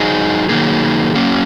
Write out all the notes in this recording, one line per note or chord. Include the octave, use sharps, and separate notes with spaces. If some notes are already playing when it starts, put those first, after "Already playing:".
Already playing: F#3 D#4 G#4
D#3 F#3 A#3 D#4 G#4
F#3 A#3 C#4